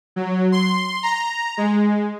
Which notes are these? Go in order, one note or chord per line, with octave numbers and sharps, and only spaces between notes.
F#3
C6
A#5
G#3